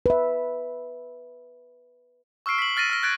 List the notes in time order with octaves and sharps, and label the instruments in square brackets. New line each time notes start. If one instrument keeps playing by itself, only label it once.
[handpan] B4 E5
[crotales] C#6 E6 F6 C7 D7
B6 F#7
F6 A6 A#6 D#7
E6 F6 A#6
F#6 G#6 A6 D7